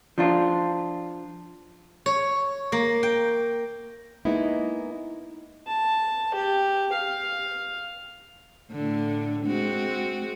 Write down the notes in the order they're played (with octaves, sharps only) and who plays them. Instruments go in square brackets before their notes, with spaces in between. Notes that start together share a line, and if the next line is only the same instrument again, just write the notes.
[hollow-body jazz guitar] F3 D4 F4
[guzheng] C#5
A#3
G5
[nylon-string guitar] G#3 A#3 B3 D#4 E4
[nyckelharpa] A5
G4
F5
[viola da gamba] A2 D3
G#3 C4 F#4